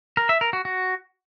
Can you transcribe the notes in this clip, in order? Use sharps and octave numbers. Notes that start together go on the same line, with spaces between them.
A#4
E5
A#4
F#4
F#4